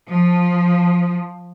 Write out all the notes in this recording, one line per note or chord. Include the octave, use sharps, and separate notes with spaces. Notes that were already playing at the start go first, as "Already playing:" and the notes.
F3